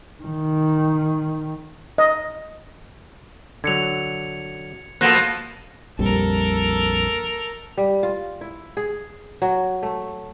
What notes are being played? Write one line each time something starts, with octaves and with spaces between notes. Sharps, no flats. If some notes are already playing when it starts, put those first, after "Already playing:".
D#3
D#5
D3 F#3 G#6 C#7 F7
F3 A#3 B3 F#4 A4 F#6 A#6
A#1 F2 G3 A4 A#4
G3
F4
E4
G#4
F#3
A3